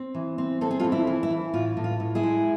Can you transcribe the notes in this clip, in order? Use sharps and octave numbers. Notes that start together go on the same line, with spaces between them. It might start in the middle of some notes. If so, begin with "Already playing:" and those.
Already playing: C4
E3
C4
C4 A4
G#4
F4 A4
E3
E4
E3
E4
E3
A2 F4
A2
F4
A2
E4 G#4
G#3